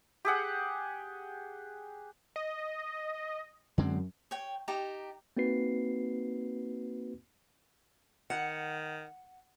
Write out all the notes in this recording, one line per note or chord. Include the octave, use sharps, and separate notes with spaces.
G4 G#4 F#5
D#5
F#2 D3 G#3 C4
C#5 G5
D#4 G4 A5 A#5
A#3 C4 D#4 F#4 B4 C7
D#3 F#5